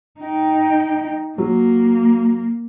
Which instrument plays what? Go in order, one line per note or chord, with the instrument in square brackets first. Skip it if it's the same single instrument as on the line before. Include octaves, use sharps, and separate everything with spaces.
[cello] D#4 G5
[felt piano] F#3 [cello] A#3